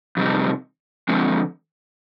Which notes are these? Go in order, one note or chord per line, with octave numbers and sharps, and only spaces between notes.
F2 C3 G3 C4 D#4
D3 F3 G#3 C4